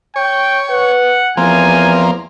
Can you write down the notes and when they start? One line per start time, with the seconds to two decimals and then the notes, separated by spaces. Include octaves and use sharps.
0.16 C#5 G5
0.70 B4 F#5
1.37 E2 F3 A#3 C4 G#5